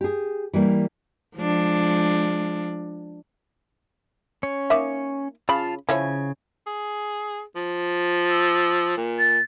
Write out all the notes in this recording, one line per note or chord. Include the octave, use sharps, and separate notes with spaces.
G4 G#4
E3 G3 A#3
F3 G#3 D4
C#4 C#5
A#3 D#4 E5
C#3 F4 F5 A5 B5
C#3 F3 E4 C#5 G#5
G#4
F3
E6
A#2
A6